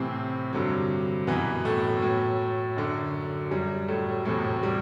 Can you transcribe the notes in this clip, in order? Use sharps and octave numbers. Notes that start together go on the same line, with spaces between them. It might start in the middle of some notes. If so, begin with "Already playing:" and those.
Already playing: A2 C3 E3 C4
G2 D3 F#3
F#2 B2 E3 B3
A2 A3
A2 F#3
F#2 D3 F#3
F#2 F#3 G3
A2 A3
E2 A2 C3 F#3 A3
G3